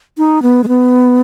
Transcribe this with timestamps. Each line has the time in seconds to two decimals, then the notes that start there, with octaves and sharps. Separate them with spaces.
0.18 D#4
0.42 B3
0.64 G#3
0.68 B3